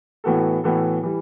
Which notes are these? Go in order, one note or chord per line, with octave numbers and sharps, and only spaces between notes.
A2 E3 B3 F#4 A4
A2 E3 B3 F#4 A4
E3 G3